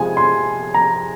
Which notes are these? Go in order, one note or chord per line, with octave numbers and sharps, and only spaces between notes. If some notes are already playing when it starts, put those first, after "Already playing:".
Already playing: C3 F3 G#3 G#5
C6
A#5